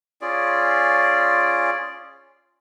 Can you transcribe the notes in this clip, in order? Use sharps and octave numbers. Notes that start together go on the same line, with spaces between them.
C#4 F4 G#4 D5